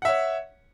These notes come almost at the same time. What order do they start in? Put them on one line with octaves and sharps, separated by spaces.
F#5 E5 C#5